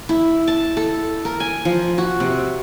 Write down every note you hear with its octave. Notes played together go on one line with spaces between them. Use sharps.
E4
A5
A4
A#4
G#5
F3
F#4
C3